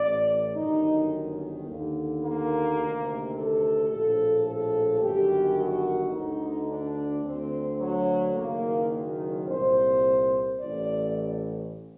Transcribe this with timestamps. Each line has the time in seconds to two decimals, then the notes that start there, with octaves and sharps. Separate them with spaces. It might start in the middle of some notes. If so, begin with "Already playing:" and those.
Already playing: A1 A2 D5
0.55 G1 F#2 D#3 D#4
1.66 D#2 D3
2.22 A#3
2.78 D2 C3 D#3
3.34 A4
3.90 A#1 A2 A4
4.46 A4
5.01 G1 F#2 D#3 G4
5.57 F#4
6.12 D2 D3 D#4
6.69 D4
7.24 D2 D3 C4
7.80 F#3
8.36 F#1 F#2 D#3 A#3
9.47 C2 A#2 C5
10.59 A1 A2 D5